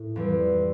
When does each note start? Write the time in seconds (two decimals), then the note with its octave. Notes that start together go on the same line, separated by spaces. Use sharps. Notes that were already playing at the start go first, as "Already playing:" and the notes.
Already playing: A2
0.16 F2 E3 G3